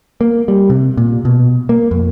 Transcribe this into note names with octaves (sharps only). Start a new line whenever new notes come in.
A#3
G3
C3
A#2
B2
A#3
F2